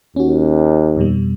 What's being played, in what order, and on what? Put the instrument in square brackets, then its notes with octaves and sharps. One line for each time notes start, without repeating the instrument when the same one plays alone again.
[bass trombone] D#2 [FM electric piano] C#4 F#4
[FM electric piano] F2 B2 G3